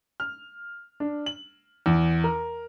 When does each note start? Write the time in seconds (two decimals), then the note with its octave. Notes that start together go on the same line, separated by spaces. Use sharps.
0.20 F6
1.00 D4
1.26 F#7
1.86 E2
2.24 A#4